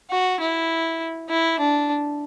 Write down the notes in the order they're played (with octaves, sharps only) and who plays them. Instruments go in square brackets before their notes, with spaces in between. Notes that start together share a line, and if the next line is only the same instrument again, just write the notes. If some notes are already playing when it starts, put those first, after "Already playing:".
[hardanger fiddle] F#4
E4
E4
D4